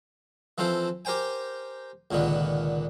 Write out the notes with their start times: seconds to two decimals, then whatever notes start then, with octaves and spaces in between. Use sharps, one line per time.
0.58 E3 F3 C4 F4 A4 C5
1.05 G4 A#4 C5 G5 G#5
2.11 C#2 A#2 D3 D#3 B3